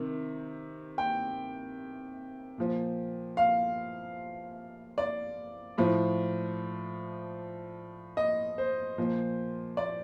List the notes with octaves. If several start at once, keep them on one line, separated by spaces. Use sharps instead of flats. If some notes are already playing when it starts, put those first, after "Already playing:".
Already playing: C3 D#3
G5
A#2 F3
F5
D5
A2 F3
D#5
C5
A#2 F3
D5